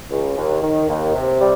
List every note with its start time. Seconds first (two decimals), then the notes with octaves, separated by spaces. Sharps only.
0.10 C#2
0.36 D#2
0.62 D#3
0.88 D#2
1.14 C3
1.40 G3